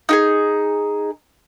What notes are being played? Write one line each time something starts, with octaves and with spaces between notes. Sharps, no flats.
D#4 G4 G#4